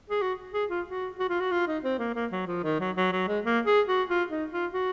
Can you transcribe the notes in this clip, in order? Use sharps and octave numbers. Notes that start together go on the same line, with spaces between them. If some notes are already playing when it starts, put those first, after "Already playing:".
G#4
F#4
G#4
F4
F#4
F#4
F4
F#4
F4
D#4
C4
A#3
A#3
F#3
F3
D#3
F#3
F#3
F#3
G#3
A#3
G#4
F#4
F4
D#4
F4
F#4